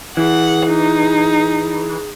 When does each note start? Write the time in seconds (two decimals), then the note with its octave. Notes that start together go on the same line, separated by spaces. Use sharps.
0.17 E3 G#4 F#5
0.67 D#4